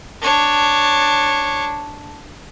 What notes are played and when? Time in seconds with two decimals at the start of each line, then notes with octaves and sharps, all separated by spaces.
0.22 D4 C#5